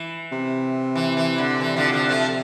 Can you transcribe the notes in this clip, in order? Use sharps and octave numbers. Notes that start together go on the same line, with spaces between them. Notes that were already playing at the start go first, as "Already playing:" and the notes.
Already playing: E3
C3
E3
E3
D3
E3
D3 F3
D3 F3
F3 A3